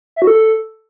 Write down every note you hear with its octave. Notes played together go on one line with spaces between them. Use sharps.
E5
F#4
A4